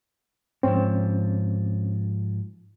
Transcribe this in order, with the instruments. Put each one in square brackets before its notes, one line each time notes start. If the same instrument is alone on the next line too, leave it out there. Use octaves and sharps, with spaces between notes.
[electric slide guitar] G#2 F3 [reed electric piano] C4 C#4